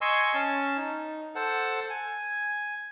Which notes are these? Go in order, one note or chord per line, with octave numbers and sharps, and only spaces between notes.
D#5 G#5 C6 C#6 E6
C#4 A5
D#4
A4 C5 F#5 A5
G#5